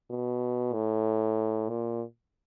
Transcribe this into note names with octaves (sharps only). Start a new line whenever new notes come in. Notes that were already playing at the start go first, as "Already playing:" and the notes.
B2
A2
A#2